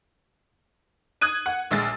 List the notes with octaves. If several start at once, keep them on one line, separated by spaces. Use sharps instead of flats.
D#6 F#6 G#6 D#7
F#5
A#1 G#3 A6